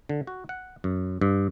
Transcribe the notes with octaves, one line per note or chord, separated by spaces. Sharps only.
D3
F#4
F#5
F#2
G2